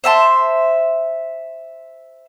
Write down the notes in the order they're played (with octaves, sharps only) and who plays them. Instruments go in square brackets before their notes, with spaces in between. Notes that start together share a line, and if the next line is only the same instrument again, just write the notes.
[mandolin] C5 E5 A5 C6